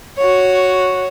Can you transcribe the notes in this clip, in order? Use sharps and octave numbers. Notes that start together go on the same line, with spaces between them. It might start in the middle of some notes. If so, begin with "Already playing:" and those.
F#4 C#5